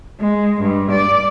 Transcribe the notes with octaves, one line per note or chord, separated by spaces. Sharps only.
G#3
G2
D5